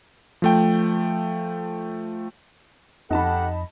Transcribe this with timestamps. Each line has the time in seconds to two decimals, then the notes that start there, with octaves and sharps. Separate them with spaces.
0.42 F3 A3 G5
3.11 F2 D#4 G4 A4 F#5 A5 B5